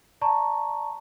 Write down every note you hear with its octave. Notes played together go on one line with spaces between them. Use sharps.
D5 A5 A#5 C#6